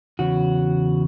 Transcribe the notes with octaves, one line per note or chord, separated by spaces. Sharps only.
E2 C#3 F#4